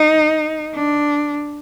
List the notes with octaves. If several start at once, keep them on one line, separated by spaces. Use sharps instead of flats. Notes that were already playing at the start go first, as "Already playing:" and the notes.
Already playing: D#4
D4